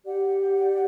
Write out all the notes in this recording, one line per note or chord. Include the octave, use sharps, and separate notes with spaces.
G4 D5 F#5